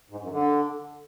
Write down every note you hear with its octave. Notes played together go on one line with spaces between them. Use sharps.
G#2
F#2
D3